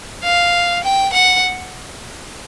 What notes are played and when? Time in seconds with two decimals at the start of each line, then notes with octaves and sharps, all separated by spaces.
0.24 F5
0.84 G5
1.13 F#5